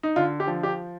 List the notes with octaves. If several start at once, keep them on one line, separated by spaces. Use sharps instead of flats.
D#4
D3 F4
G4
F3
G4